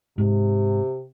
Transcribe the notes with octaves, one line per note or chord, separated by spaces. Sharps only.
G#2 C3